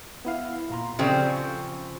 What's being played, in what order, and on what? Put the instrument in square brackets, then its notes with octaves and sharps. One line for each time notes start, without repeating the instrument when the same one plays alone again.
[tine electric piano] B3 E4 F5
A#2 A#5 C6
[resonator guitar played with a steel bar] C#3 F3 C4 [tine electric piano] G4 A4 D5
[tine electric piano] C#6